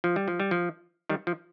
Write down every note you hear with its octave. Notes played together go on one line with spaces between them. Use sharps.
F3
G3
F3
G3
F3
D#3 G3
F3